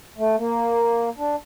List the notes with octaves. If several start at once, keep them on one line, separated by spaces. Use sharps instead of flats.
A3
A#3
D4